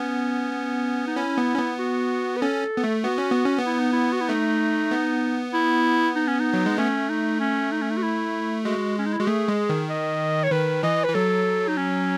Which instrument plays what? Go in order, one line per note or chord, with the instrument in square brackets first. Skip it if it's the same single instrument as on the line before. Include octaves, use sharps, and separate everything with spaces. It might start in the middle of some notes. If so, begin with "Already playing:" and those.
Already playing: [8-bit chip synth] B3 [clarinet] C#4
[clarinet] D#4
[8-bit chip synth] C#4 [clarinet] E4
[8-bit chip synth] B3
C#4
B3
[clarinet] F#4
B4
[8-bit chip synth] C#4 [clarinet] A4
[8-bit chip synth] B3
A3
[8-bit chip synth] B3 [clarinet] F#4
[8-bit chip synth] C#4
B3
C#4
B3
[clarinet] E4
D#4
E4
F#4
E4
[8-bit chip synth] A3 [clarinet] D#4
[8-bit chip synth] B3
[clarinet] E4
D#4
C#4
D#4
[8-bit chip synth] F#3
G#3
[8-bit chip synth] A3 [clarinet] C#4
[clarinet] D#4
C#4
D#4
C#4
D#4
F#4
E4
[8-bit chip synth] G#3 [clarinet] F#4
[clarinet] C#4
D#4
E4
[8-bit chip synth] G#3 [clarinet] F#4
[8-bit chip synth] A3 [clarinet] G#4
[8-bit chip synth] G#3
D#3
[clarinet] D#5
C#5
[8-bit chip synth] D#3 [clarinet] B4
[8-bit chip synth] E3 [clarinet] D#5
[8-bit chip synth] E3 [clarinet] B4
[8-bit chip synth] F#3 [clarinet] A4
[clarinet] D#4
C#4